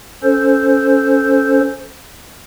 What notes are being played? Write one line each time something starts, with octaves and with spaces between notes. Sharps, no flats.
C#4 A4 C5